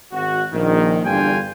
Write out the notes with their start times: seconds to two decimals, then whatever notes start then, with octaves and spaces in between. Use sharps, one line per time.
0.12 G#1 F#4
0.53 A#1 D#3
1.05 E2 G2 D3 F4 G5 G#5